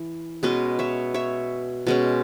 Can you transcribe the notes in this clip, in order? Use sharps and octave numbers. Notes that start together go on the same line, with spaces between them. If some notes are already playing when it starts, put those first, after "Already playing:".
Already playing: E3
B2 G#3 C#4 B4 D#5
C#5 E5
C#5 E5
B2 G#3 C#4